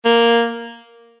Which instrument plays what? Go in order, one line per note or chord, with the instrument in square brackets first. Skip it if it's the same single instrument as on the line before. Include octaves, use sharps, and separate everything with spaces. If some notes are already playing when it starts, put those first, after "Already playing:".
[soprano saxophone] A#3